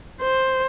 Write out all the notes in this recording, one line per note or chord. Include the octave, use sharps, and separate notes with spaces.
C5